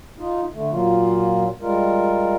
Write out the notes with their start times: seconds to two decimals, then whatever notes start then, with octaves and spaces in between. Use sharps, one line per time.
0.18 D#4 F4
0.54 D3 A3
0.71 A#2 F#3 A#3 F4
1.61 G3 G#3 F4 A#4